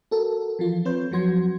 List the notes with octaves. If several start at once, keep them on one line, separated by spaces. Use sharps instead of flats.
F#4 A4 A#4
E3 F3 F4
C4 B4 C#5 C6 G6
F2 F3 F#3 F#4 C6 G#6